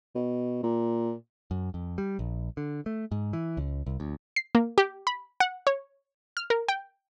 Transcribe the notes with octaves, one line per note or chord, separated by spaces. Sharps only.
B2
A#2
F#2
F2
G3
A#1
D3
A3
G#2
E3
C#2
C2
D2
C7
A#3
G4
B5
F#5
C#5
F6
A#4
G5